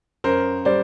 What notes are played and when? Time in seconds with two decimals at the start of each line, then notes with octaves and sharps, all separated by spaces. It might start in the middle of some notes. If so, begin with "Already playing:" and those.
0.24 F#2 A#4 C5
0.65 G3 C5 D5